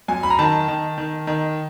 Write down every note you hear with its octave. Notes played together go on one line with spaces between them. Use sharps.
F#2 G#5
B5
A#5
D#3 A5
D#3
D#3
D#3